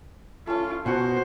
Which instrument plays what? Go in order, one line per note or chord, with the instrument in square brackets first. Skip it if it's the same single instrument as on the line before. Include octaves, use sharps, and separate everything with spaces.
[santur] A3 C#4 [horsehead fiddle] F4
[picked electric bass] B2 [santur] F#4 F#5 G#5 [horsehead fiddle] C5